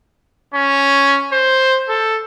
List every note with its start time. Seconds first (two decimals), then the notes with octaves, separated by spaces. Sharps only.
0.54 C#4
1.33 C5
1.89 A4